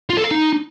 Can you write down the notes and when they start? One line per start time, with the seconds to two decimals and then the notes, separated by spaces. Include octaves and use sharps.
0.10 F4
0.17 A4
0.24 F5
0.31 D#4